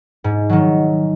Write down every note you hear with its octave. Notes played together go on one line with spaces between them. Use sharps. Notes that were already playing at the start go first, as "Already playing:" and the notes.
G#2
D#3 F#3